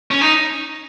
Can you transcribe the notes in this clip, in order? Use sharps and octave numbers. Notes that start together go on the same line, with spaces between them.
C#4
D#4